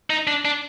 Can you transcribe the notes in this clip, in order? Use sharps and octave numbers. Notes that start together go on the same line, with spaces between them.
D#4
D4
D4